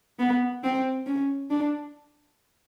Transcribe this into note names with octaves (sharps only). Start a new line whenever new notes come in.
B3
C4
C#4
D4